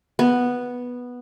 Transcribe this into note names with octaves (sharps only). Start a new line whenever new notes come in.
B3